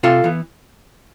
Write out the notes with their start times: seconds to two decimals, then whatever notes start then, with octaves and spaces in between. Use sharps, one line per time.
0.03 C3 F4 A4
0.24 E3 B3